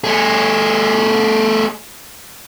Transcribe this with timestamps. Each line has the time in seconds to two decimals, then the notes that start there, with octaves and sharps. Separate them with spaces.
0.04 A3 G#4